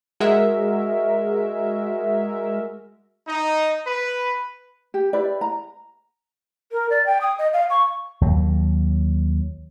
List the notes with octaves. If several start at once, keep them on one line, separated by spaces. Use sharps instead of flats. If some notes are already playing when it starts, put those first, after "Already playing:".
G#3 F#4 G#4 A#4 E5
D#4
B4
G4
E4 G4 B4 D5
A#5
A#4
D5
G5
D#6
D#5
F5
C#6
D#2 F#3